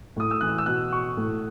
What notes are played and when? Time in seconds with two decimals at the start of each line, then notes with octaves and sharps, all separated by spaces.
0.16 A2 D#6
0.31 E6
0.41 E3 F#6
0.58 E6
0.66 B2 F#6
0.92 C#6
1.17 A2